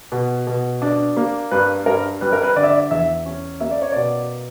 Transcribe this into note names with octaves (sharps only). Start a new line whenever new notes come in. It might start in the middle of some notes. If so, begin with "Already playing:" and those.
B2
B2
D4
A#3
G2 B4
G2 A#4
G3 B4
A#4
B4
D3 D5
E5
D5
E2 E5
C#4
A#3 E5
D5
C#5
B2 D5